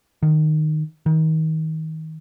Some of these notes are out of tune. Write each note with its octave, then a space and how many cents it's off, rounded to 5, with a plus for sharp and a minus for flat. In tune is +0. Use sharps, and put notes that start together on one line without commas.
D#3 -15
D#3 +30